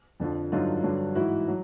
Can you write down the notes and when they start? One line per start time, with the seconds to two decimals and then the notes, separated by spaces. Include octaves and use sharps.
0.20 F2 D3 F3
0.52 G2 D3 F#3 D#4 F4
0.83 G2 D3 F#3
1.15 G#2 E3 E4 F#4
1.48 F#3